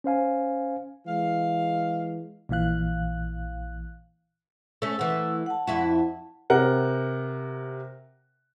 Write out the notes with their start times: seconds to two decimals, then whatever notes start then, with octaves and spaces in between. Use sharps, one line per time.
0.04 C#4 C5 F5 G#5
1.06 E3 G#3 F5
2.49 A#1 A#2 E3 F5 F#6
4.82 A3 C#4 E6
4.99 E3 A3 F#5 E6
5.46 F#5 A5
5.67 F2 E4 F#4
6.50 C3 A#4 F#5